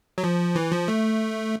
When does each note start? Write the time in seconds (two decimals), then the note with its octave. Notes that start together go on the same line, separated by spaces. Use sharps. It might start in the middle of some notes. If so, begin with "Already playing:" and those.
0.18 F#3
0.24 F3
0.55 E3
0.72 F3
0.88 A3